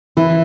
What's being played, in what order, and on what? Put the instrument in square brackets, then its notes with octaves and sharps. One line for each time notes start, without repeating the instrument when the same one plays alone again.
[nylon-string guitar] E3 [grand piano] E4